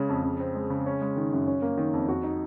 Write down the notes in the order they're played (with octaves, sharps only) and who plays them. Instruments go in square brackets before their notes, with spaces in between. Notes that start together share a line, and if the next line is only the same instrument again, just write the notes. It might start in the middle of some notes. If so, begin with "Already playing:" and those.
Already playing: [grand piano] C#3 G#3 C#4
F2
C#3
C4
G#3
C#3
C#4
G#3
D#3
F#2
C#4
A#3
D#3
F2
F#4
D#4